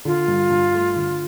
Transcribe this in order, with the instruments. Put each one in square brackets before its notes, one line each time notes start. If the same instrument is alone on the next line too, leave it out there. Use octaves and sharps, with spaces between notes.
[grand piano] D3 [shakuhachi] F4
[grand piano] G2
G2
A3
D3